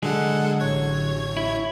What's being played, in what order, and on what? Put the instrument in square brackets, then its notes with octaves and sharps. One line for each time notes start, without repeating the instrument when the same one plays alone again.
[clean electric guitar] D3 F#3 G#4 [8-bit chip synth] G#3 A4 F#5
[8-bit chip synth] A1 C#5 G#6
[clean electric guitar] E4